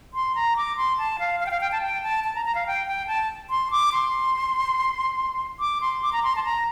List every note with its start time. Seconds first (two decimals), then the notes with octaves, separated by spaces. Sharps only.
0.14 C6
0.35 A#5
0.57 D6
0.77 C6
0.98 A5
1.19 F5
1.40 F5
1.46 G5
1.51 F5
1.61 G5
1.72 A5
1.82 G5
2.03 A5
2.24 A5
2.35 A#5
2.45 A#5
2.55 F5
2.67 G5
2.87 G5
3.07 A5
3.50 C6
3.71 D6
3.93 C6
5.60 D6
5.81 C6
6.02 D6
6.13 A#5
6.23 C6
6.36 A5
6.44 A#5